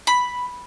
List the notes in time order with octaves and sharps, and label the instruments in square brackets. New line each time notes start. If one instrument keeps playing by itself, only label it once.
[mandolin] B5